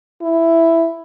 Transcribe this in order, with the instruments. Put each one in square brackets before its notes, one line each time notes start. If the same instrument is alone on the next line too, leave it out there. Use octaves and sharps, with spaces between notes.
[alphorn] E4